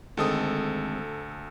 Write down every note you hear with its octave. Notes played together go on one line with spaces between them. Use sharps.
D2 D#3 G#3 C4 A4 D#6